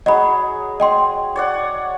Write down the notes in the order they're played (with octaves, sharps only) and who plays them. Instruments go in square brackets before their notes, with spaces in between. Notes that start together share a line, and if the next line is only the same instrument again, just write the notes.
[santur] F#3 G#4 [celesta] D#5 B5
[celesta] D#5 G5 C6
[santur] C#5 D5 F#5